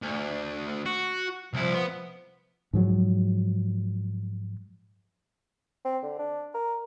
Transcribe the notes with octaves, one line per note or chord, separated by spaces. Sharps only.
D2
F#4
C2 F3 E4
B3
G#2 F3 F#3 G#3
C4
D3
D4
A#4